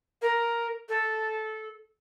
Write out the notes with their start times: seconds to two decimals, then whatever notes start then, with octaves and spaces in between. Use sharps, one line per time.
0.22 A#4
0.89 A4